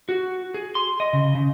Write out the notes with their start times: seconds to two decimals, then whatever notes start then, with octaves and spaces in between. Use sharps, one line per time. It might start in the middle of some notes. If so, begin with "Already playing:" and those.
0.09 F#4
0.54 G#4
0.75 C6
1.00 D#5
1.13 C#3
1.35 C#3